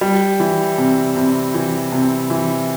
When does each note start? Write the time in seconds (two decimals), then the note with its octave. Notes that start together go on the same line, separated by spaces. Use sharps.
0.01 G3
0.40 E3
0.78 C3
1.16 C3
1.54 E3
1.92 C3
2.30 E3